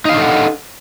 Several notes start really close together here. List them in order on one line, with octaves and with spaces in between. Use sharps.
D#4 F5 D4 A4 F#5